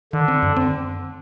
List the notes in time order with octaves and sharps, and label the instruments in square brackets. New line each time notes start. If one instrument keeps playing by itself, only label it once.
[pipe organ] D3 [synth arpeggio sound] D#3
[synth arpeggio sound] C4
F#2
C4